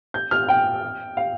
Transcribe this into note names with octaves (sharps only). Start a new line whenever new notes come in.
G6
F6
G5
F5